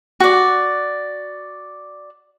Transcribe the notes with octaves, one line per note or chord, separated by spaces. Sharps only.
F#4 D5